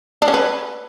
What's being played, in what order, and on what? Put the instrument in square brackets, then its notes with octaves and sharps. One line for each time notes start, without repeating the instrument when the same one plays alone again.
[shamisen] D4
C#4
B4